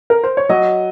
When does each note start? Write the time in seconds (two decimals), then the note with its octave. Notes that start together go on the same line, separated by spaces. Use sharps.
0.10 A#4
0.23 C5
0.37 C#5
0.49 F#3 D#5